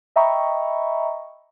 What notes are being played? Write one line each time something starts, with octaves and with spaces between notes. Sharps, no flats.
D#5 E5 G5 A#5 B5 C#6